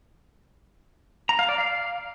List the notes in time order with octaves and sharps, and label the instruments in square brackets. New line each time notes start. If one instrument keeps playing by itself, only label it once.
[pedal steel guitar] A#5
F5
D5
F5